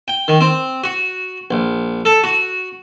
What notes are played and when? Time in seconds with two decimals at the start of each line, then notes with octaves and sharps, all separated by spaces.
0.08 G5
0.28 D#3
0.41 C4
0.84 F#4
1.51 A#1
2.05 A4
2.24 F#4